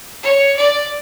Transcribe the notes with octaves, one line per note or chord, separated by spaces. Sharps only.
C#5
D5